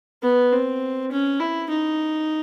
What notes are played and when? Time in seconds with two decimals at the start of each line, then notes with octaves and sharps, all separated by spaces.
0.23 B3
0.52 C4
1.11 C#4
1.40 E4
1.70 D#4